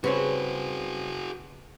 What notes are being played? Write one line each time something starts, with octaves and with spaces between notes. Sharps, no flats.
C#3 G3 C4 F#4 G#4 B4 C#5